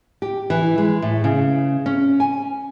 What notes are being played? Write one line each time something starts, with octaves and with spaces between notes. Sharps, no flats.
G4
E3
G#3
A2
C#3
C#4
G#5